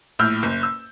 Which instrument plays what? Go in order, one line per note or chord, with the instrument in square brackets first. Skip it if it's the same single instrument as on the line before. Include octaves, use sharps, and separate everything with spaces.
[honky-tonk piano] A#1 A2 E6 F6 G6
F#1
E6